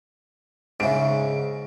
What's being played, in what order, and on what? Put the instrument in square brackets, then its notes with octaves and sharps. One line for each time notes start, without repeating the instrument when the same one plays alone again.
[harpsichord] G#2 C#3 [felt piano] E5 D7